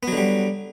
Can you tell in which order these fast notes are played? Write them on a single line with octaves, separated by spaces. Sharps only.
B3 F#3 D3 G3